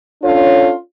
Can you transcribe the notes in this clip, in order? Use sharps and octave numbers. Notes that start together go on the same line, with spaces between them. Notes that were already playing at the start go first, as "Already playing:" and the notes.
C#4 D4 F4 A4 C#5